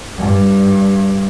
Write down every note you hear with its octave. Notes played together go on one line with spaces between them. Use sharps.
G2